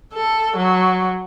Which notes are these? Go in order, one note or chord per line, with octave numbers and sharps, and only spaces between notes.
A4
F#3